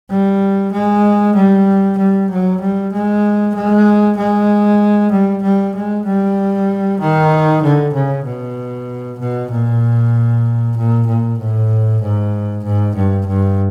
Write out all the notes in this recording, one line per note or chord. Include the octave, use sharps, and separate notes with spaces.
G3
G#3
G3
G3
F#3
G3
G#3
G#3
G#3
G3
G3
G#3
G3
D#3
D3
C#3
B2
B2
A#2
A#2
A#2
A2
G#2
G#2
G2
G2